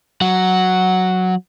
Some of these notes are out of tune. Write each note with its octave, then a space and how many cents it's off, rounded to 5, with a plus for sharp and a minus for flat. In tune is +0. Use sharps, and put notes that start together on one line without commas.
F#3 +0 F#5 +0